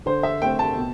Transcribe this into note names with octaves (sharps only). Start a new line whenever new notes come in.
D3 C5
E5
A3 C4 G5
A5
B2